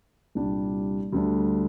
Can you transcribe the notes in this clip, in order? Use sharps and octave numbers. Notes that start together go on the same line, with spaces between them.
C2 A#2 G3 D4
D2 D3 G3 D4